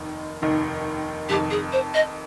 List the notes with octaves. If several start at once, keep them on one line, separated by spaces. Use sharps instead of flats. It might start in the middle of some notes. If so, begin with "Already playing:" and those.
Already playing: F1 D#2 D#3
F1 D#2 D#3
F1 F2 D#3 G4
G#4
C5
D#5